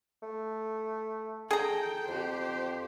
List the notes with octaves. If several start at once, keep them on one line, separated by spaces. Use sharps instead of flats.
A3
G#4 A4 G5 A#5
F2 G4 C5